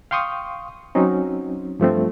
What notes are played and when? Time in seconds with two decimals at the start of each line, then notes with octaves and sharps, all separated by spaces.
0.11 F5 G5 C6 C#6 D#6
0.95 F#3 C4 C#4 D#4
1.80 G2 F3 A3 C4